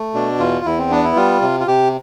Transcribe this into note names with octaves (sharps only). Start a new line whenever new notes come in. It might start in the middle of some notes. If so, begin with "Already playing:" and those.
Already playing: A3
B2 D4
E2 F4
E2 E4
C4
B3 D4
E4
G3 F4
C3
F4
C3 G4